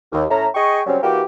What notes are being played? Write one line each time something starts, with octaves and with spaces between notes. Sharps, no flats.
D#2
A2 C#4 A4 E5 A#5
G#4 D#5 G5 C#6
C#3 F#3 G3 C4 C#4
E3 A#3 F#4 G4